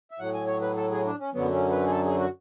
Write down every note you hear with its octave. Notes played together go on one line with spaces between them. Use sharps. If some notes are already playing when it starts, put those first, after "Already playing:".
E5
A2 F#3 F#5
G#5
C#5
B4
A4
G#4
D4
C#4
F#2 D3 F#3 B3
C#4
B4
G#4
A4
G#4
F#4